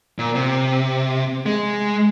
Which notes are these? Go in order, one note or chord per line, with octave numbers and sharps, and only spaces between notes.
A#2
C3
G#3